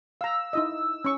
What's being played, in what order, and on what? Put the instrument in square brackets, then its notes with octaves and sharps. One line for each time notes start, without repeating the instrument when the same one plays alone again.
[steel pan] F5 A#5 [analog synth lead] E6
[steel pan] D#4 E4 D#5
C#4 C#6